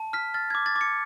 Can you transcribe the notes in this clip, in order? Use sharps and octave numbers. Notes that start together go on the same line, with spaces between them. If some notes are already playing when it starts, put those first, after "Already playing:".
Already playing: A5
F6 B6
F6 A6
D6 G#6
A6
D6
C#7